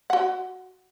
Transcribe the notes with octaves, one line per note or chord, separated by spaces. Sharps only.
F#4 F#5